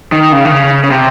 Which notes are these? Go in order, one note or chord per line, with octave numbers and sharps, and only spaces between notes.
D#3
C#3
D#3
C#3
C#3
C3